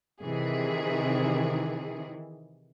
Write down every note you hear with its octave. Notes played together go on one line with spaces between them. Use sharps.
C3 D#3 E3 G#4